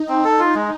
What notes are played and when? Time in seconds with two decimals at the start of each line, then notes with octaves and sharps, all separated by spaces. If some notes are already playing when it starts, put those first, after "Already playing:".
Already playing: D#4
0.09 C4
0.25 A4
0.39 F4
0.55 G#3